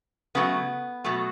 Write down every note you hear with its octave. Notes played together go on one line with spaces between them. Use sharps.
C#3 F#3 A3 B3
B2 F#3 A3